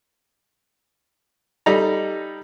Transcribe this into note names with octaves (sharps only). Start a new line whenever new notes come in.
G3 D#4 A4 A#5